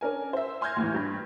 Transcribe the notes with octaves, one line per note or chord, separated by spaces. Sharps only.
C#4 D4 A#4 G#5
C5 E5
G#5 C6 F6 G6 G#6 A#6
D#2 A2 E3
G2